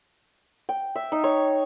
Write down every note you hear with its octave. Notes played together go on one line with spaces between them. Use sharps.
G5
E5
D#4
C#5